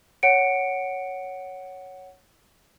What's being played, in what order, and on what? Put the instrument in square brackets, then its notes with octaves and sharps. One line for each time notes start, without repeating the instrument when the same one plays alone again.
[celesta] C#5 F#5 C#7 D7